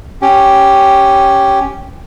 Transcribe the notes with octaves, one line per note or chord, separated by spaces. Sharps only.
C#4 G4